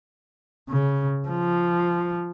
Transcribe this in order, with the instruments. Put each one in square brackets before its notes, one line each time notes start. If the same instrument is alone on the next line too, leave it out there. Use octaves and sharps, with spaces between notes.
[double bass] C#3
F3